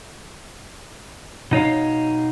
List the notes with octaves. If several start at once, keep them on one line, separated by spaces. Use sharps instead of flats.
B2 D#4 C#5 F5